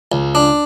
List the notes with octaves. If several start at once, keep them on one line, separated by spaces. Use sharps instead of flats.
C#2
D4